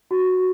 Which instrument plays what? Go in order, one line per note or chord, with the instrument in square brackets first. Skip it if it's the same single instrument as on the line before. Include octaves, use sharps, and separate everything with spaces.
[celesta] F#4